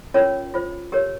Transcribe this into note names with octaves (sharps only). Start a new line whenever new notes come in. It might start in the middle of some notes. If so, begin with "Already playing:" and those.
C#4 F4 A#4 C#5
F4 C5
G4 A#4 C#5